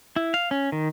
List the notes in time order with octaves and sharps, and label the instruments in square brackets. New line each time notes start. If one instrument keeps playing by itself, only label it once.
[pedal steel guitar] E4
F5
C#4
D#3